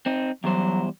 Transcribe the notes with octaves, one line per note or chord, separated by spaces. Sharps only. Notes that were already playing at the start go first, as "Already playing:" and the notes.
C4 D#4
E2 F#3 G3 C5